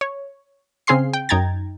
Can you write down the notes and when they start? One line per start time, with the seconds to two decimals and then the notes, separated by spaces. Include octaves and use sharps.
0.01 C#5
0.87 C#3 C4 G#4 F5 C6 C7
1.13 G5
1.29 F#2 D#4 G5 A#5 G#6 A6